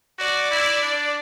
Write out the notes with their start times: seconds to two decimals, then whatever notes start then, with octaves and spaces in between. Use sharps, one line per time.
0.19 F#4 D5
0.51 E4
0.83 D4